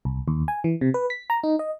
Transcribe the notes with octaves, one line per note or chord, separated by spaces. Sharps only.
C2
D#2
G#5
E3
C3
B4
B6
A#5
D#4
D#5